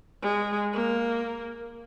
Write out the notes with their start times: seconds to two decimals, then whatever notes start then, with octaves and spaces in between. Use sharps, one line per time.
0.22 G#3
0.73 A#3